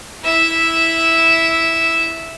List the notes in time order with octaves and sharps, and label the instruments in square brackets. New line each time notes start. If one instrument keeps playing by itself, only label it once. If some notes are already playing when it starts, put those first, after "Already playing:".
[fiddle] E4 E5